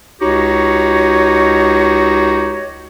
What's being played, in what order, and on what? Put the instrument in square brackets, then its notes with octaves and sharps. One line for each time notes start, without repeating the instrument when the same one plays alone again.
[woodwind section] C#2 D#4 F#4 G4 C#5